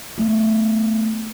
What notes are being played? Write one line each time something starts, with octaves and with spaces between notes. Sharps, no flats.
A3 B3